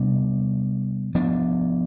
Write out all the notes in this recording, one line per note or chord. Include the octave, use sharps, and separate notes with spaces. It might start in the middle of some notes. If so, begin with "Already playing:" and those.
Already playing: C3 G3 B3 D4
F3 B3 D4